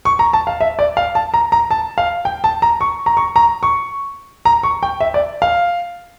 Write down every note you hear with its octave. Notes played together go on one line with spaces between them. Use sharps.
C#6
A#5
A5
F5
E5
D5
F5
A5
A#5
A#5
A5
F5
G5
A5
A#5
C#6
A#5
C#6
A#5
C#6
A#5
C#6
G5
E5
D5
F5